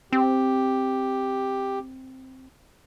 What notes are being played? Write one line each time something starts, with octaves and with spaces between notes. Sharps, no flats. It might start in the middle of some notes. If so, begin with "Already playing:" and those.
C4 G4